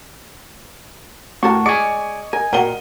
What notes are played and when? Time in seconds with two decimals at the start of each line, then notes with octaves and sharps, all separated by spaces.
1.43 A2 F#4 G4 A#4 F#5 A5 C#6
1.66 G#3 D5 D#5 G#5 C#6 D6 C#7
2.33 A#4 G#5
2.53 A#2 F#4 A#4 F#5 G5 D#7 G7